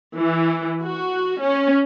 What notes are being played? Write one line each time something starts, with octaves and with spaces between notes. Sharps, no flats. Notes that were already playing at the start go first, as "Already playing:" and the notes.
E3
F#4
C#4